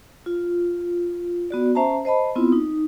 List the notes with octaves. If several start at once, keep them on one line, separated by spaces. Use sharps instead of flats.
F4
B3 F#4 D5
C#4 C5 E5 A5 A#5
C5 D#5 A5 B5
B3 C4 E4 F4
D#4